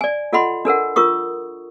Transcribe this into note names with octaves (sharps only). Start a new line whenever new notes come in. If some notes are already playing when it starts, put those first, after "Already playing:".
D5 G#5
F4 A4 D#5 F#5 B5 C6
D4 A4 A#4 F#5
F4 A#4 C#6 D#6